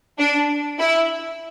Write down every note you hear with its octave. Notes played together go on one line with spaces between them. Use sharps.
D4
E4